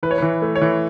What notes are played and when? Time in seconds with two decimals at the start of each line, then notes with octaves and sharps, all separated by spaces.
0.03 E3 B4
0.11 C#5
0.18 E3 B4
0.42 A3
0.55 C#5
0.62 E3